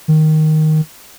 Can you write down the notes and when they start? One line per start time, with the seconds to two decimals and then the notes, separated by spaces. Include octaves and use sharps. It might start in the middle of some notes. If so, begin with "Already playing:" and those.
0.08 D#3